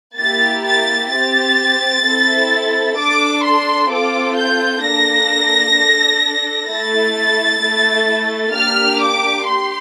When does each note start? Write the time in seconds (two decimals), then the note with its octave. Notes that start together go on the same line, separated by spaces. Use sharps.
0.19 A#3 E4 G4 A6
0.65 A6
1.11 C4 G4 A6
2.05 C4 E4 A4
2.97 D4 A4 D6
3.44 C6
3.90 C4 F4 A4 D6
4.37 G6
4.83 A#3 D4 A4 A#6
5.76 D4 A4
6.69 A3 E4 A4 A6
7.62 A3 E4 A4
8.54 A#3 D4 G4 F6
9.01 D6
9.48 G4 C6